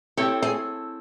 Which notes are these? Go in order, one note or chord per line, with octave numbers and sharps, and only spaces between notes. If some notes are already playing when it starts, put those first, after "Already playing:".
C4 E4 G4 A4 C#5
G#4